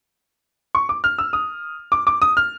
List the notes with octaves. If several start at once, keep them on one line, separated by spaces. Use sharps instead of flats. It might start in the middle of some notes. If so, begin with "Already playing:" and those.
C#6
D6
F6
E6
D#6
D6
D6
D#6
F6